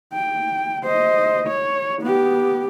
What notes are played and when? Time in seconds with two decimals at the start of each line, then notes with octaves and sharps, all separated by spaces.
0.14 G5
0.84 C5 D#5
1.47 C#5
2.02 B3 G4